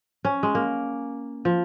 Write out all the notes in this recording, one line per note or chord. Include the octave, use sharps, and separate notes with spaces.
C#4
G#3
A#3
F3